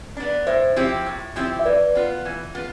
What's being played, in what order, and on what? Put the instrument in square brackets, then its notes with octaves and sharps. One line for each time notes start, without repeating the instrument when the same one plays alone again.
[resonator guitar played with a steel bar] B3 D4
[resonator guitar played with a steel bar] A2 [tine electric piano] C5 E5
[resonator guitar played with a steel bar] F3 C4 E4 G4
A2
F3 C4 E4 G4
[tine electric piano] E5
[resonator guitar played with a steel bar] E3 [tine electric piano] B4 D5
[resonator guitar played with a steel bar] B3 F4
E3
B3 F4